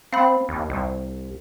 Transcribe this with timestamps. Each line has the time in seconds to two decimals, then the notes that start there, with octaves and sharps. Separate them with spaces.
0.13 C4 F5 B5
0.49 D#2
0.70 C2